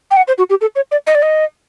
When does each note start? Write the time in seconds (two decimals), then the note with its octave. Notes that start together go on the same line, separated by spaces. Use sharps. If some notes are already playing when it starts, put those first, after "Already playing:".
0.11 G5
0.17 F#5
0.28 C5
0.38 F#4
0.50 G4
0.61 A4
0.76 C#5
0.91 D5
1.07 D#5
1.15 D5
1.22 D#5